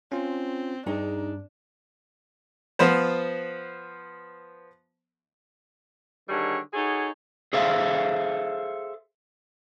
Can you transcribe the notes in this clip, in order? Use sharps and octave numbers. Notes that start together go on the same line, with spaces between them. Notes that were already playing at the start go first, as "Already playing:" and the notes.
C4 C#4 F4
G2 D4 D#4 G#4 A#5
F3 B3 C5
D3 D#3 G3 G#4 C#5
D#4 F#4 G#4 A4 C#5
G#4 A4 C5 E5 F5